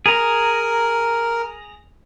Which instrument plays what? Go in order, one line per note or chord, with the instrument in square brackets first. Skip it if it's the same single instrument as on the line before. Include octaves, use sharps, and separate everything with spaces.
[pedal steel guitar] G#4 A#5 [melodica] A#4